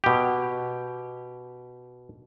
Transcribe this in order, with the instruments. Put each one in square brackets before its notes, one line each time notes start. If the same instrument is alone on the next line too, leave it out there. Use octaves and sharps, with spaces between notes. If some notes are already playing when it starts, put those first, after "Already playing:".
[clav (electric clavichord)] B2 G4